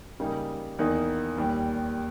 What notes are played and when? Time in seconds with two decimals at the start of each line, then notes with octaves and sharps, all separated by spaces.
0.20 C#3 G3 A#3 D#4
0.79 E2 D#3 A#3 D#4
1.37 D#2 D#3 G3